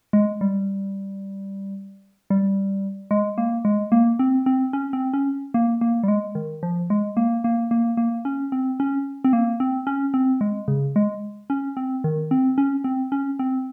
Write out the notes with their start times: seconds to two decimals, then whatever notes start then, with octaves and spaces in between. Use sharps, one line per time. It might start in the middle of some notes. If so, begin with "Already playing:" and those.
0.13 G#3
0.41 G3
2.30 G3
3.11 G#3
3.38 A#3
3.65 G#3
3.92 A#3
4.19 C4
4.46 C4
4.73 C#4
4.93 C4
5.14 C#4
5.54 A#3
5.81 A#3
6.03 G3
6.08 G#3
6.35 D#3
6.63 F3
6.90 G#3
7.17 A#3
7.44 A#3
7.71 A#3
7.97 A#3
8.25 C#4
8.52 C4
8.80 C#4
9.24 C4
9.33 A#3
9.60 C4
9.87 C#4
10.14 C4
10.41 G#3
10.68 C#3
10.96 G#3
11.50 C#4
11.77 C4
12.04 D#3
12.31 C4
12.58 C#4
12.84 C4
13.12 C#4
13.39 C4